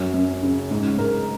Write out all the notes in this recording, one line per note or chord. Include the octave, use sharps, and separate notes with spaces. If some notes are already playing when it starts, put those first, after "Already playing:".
Already playing: F#2 F#3
F#2
C#3
G#2
G#2 A#4